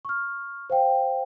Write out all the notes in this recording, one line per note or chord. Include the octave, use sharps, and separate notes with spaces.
C#6 F6
C5 F5 G5